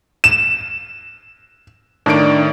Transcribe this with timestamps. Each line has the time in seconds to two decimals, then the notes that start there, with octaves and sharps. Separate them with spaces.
0.24 E7
2.06 A2 D#3 D4 D7